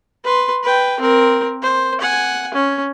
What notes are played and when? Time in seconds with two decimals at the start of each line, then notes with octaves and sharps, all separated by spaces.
0.24 B4 C6
0.63 B4 G5
0.99 C4 A#4
1.62 C5
2.01 F#5 G#5
2.54 C#4